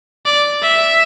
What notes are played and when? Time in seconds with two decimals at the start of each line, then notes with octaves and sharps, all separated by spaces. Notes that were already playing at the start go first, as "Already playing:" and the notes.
0.26 D5
0.62 E5